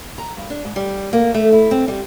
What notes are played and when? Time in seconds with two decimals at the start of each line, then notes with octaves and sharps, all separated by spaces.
0.18 A#5
0.37 G2
0.50 D4
0.65 G#2
0.76 G3
1.13 A#3
1.34 A3
1.52 E4
1.71 C4
1.88 G3